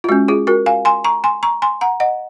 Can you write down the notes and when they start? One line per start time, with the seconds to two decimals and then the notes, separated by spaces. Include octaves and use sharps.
0.04 F4
0.09 G#3 C#4 F#4
0.28 F4 G#4
0.47 F#4 A#4
0.66 F5 G#5
0.85 G#5 C6
1.04 A#5 C#6
1.24 G#5 C6
1.43 A#5 C#6
1.62 G#5 C6
1.81 F#5 A#5
2.00 D#5 F#5